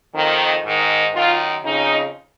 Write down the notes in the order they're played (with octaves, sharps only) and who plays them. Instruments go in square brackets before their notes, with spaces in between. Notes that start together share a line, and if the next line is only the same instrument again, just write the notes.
[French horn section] F2 D#3
G#2 D#3
F#2 D#3 F4
F2 C#3 D#4